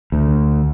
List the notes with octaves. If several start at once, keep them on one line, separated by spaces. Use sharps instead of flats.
D2